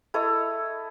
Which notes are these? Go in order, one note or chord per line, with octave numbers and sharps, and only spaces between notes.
E4 A4 C#5 D#5